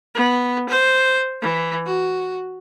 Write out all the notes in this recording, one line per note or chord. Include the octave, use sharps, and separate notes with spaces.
B3
C5
E3
F#4